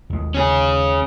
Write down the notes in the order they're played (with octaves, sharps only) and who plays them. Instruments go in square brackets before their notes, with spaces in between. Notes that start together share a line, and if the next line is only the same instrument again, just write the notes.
[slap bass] D#2 G#3
[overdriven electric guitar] C#4 G#4